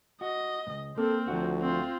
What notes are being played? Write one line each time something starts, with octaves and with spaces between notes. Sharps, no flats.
F#4 D#5
C#2 G2
A#3 C4 A4
D2 F3 F#4
C4 F4